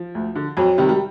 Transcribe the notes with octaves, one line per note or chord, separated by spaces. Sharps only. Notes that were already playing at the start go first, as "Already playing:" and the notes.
Already playing: F3
D2
D3
F2 F#3
C3 D#3 G3
G3